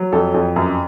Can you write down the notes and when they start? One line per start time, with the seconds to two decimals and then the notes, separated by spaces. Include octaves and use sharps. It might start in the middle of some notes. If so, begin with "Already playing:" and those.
Already playing: F#3
0.12 F2 A4
0.34 F2
0.56 F#2